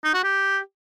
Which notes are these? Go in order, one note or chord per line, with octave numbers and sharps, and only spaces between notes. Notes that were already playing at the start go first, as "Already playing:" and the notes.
D#4
F#4
G4